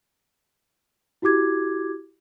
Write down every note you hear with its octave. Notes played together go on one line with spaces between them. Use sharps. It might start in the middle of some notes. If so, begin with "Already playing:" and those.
E4 F#4 G4 D6 G#6